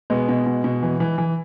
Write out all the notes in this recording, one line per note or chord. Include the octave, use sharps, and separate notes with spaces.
B2 G#3 B3
B2
B2
B2
E3
E3
E3